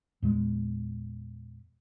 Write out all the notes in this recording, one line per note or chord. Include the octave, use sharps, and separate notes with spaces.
E2 A#2 G#3